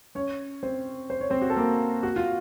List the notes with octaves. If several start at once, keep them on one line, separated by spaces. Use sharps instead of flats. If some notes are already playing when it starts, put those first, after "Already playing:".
C#4 C#5
C4 C5
C5
C#5
C4 C5
F#4
A4
A#3 A#4
F#4
F4